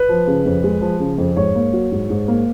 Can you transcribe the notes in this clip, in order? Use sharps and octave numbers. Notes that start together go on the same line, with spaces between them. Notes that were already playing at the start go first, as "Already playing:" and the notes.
Already playing: B4
F3
C#3
F2
G#3
F3
C#3
F2
G#2 C#5
A#3
F#3
G#2
G#2
A#3